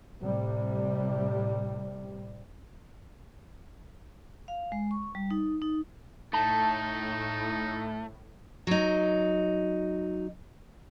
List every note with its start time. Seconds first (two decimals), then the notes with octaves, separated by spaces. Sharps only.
0.19 A2 C3 G3
4.48 F5
4.72 G#3
4.91 C#6
5.15 G3
5.30 D#4
5.62 D#4
6.33 A2 A3 D#4 A5
8.67 F#3 D#4